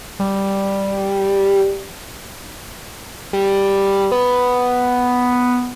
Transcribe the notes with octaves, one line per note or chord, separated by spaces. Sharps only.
G3
G3
B3